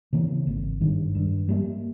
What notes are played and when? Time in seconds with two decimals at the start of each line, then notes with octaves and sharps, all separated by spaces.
0.13 C#3 E3 A#3
0.47 G#1
0.81 G2 D#3
1.15 G2
1.49 G3 A#3